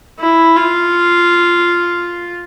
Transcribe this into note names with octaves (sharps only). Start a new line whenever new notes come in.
E4
F4